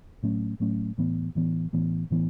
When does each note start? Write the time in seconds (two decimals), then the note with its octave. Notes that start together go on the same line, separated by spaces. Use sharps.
0.23 A2 F#3 A3 C#4
0.60 A2 F#3 A3 C#4
0.98 A2 E3 B3
1.35 A2 E3 B3
1.73 A2 E3 B3
2.11 A2 E3 B3